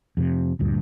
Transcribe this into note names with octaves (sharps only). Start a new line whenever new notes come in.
F2 C3
D#1 D2 G2 A#2